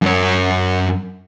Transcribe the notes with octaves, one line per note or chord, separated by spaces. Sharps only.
F#2 C#5